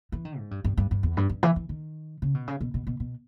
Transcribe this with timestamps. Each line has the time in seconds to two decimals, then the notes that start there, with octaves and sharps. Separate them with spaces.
0.12 E3
0.25 D#3
0.38 G#2
0.51 G2
0.65 G2
0.78 G2
0.91 G2
1.03 E2
1.17 G2
1.30 G2
1.43 E3
1.56 E3
1.69 D#3
2.22 C#3
2.35 B2
2.48 C#3
2.61 B2
2.74 B2
2.87 B2
3.00 B2